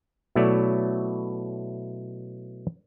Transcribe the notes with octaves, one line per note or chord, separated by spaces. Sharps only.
B2 F#3 A3 E4 C#5 D5